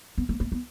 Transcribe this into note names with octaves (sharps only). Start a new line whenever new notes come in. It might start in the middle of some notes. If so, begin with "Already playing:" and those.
B3
A#3
A#3
B3